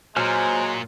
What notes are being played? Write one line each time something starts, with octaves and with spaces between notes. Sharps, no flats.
A#2 F#3 G#3 C5 G#5 F6